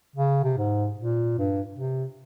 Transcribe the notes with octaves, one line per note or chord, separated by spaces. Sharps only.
C#3
C3
G#2
A#2
G2
C3